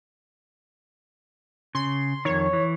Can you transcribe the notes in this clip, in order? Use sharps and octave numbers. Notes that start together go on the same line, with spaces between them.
C#3 C6
F2 D#3 C#5
E3